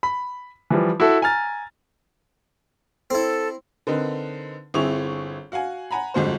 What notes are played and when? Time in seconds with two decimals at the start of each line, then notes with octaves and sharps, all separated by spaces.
0.03 B5
0.70 E3 F3 G3
1.00 E4 F#4 A4
1.22 G#5 A#5 F6 A6
3.10 C4 E4 A4
3.87 D3 C4 D#4 A#4 B4
4.74 G1 C4 E4 G#4 C#6 F7
5.52 F#4 F5 F#5 G#5
5.91 F#5 G#5 A#5 B5
6.14 G1 F2 G#2 F#4 C5